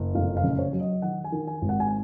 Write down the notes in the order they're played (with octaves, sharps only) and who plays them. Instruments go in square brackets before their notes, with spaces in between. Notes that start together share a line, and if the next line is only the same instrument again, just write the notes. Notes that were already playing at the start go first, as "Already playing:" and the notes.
Already playing: [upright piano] F#1
F1 F5
F5
C#3
C#5
F#3
D#5
D#3 F#5
G#5
D#3
G#5
G#1
F#5
G#5